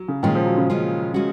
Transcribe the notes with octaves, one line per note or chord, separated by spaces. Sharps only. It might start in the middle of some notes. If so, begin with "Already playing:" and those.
Already playing: F#3
C#3
A#2 D#3 G#3 C#4 F4
F3
F#3
C#3
A#2 G#3 C#4 F4
G#3 C#4 F#4